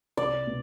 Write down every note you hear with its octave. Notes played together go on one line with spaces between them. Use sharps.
C2 D5
B2